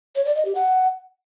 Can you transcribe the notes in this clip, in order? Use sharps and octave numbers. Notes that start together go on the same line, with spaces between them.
C#5
D5
D#5
G4
F#5